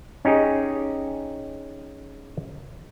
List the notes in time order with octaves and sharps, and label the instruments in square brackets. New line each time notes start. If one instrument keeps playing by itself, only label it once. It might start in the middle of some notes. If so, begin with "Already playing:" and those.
[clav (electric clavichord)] C#4 D#4 G4 G#4